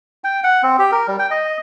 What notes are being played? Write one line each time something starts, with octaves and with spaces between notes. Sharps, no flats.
G5
F#5
C4
G4
A#4
G3
G5
D#5